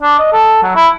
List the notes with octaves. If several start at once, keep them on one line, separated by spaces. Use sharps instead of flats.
D4
D#5
A4
F#3
E4